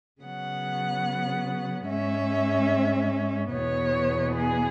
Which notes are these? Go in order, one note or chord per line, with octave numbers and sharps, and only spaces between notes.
C#3 F#3 B3 F#5
G#2 G#3 C#4 E5
E2 B2 B3 C#5
G#4